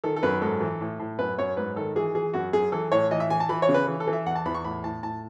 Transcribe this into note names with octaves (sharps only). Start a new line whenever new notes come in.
D#3 A4
A4
F#2 B4
G#2 A4
E3
A2
A2
F#2 B4
F#2 C#5
G#2 B4
D#3 A4
E3 G#4
E3 G#4
F#2 F#4
F#2 G#4
E3 A4
A2 C#5
E3 D#5
E5
E3 G#5
A5
E3 B5
C#5
C#3
B4
E3
A4
E3
E5
E2 F#5
A5
E2 B5
C#6
A2 B5
A2 A5
A2 A5